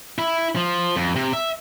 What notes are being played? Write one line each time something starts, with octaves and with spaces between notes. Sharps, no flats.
E4
F3
F2
C3
E5